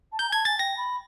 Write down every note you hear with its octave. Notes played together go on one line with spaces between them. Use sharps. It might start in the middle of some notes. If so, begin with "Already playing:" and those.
A5
A#5 G6
G#5
A5 G#6
G#5 A6
G5 A#6
B5